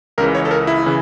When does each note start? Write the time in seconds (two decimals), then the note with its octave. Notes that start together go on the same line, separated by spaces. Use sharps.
0.18 C#2 A#4
0.20 C#3 E3
0.35 C#5
0.45 A4
0.51 A#4
0.67 E4
0.86 C#3 E3